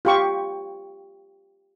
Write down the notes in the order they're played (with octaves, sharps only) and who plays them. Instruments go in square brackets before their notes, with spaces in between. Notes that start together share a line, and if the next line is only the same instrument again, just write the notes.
[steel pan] F4 G4 C#6